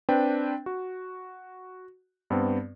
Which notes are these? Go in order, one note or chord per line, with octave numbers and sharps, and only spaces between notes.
C4 D4 B4 G5
F#4
G2 B3 C4